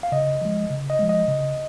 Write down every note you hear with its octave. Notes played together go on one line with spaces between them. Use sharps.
F5
C#3 D#5
F3 G#3
C#3
D#5
F3 G#3
D#5
C#3